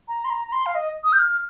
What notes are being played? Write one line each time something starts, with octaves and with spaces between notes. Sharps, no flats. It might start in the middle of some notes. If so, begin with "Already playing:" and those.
A#5
C6
A#5
A#5
C6
F5
D#5
D#6
G6
F6